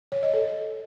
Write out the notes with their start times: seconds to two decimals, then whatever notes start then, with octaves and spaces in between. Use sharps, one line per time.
0.12 C#5
0.23 D#5
0.34 A4